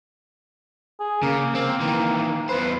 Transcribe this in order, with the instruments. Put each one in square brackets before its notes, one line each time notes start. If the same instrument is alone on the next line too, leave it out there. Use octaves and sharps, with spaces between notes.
[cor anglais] G#4
[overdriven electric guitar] C#3 [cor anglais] A#3
[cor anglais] A#3 [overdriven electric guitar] C4
[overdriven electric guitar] D#3 E3
[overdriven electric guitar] E2 C5 [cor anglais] B4